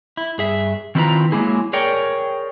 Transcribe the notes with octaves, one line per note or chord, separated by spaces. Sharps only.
E4
G2 G#4 E5
D#3 C4 E4 F4 B4 A#5
F#3 G#3 A#3 E4 G#4
G#4 A#4 C#5 D5 G5